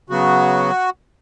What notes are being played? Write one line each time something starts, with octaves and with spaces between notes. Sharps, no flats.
C#3 F#3 B3 F#4